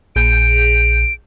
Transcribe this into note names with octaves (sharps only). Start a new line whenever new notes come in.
A#1 G#4 G6 D7